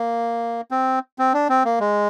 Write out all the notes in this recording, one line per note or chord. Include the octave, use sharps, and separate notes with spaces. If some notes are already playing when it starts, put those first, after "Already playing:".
Already playing: A#3
C4
C4
D4
C4
A#3
G#3